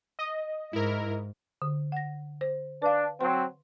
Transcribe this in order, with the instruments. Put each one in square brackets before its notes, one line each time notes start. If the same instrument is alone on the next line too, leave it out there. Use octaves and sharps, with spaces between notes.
[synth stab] D#5
[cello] G#2 [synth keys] E4 A#4
[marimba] D3
F#5 A#6
C5
[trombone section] D4 [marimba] B4 F5
[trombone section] F#3 C4 [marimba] C6